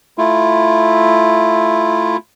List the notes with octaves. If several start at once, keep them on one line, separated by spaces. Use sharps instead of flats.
A3 E4 F4